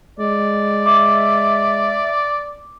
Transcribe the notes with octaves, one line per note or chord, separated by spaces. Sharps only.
G#3 D5
E5 D6